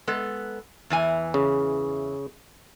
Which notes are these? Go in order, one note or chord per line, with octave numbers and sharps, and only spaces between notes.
G#3 B3 A4
E2 E3 G#5
C#3